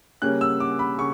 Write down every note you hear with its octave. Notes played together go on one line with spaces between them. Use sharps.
C#3 G3 A#3 C#4 F#6
E6
D6
B5
C#3 C#6